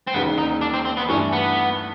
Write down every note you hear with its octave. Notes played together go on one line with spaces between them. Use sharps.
C4
E1 D#2 C#3 B3
D#4
D4
C4
C4
B3
G2 E3 A3 C#4 D4
B3